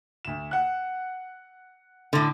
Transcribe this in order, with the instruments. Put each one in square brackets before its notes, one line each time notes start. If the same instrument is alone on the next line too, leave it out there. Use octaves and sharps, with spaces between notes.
[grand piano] D2 E7
F#5 F#6
[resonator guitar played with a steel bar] A2 D3